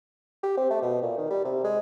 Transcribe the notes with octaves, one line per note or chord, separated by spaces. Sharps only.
G4
C4
A3
B2
A#2
D#3
G3
C3
G#3